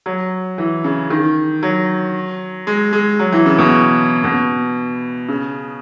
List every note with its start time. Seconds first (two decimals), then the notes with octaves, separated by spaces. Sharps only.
0.06 F#3
0.58 E3
0.84 C#3
1.10 D#3
1.63 F#3
2.67 G#3
2.93 G#3
3.19 F#3
3.32 E3
3.46 C#3
3.58 B2
4.24 B2
5.29 C#3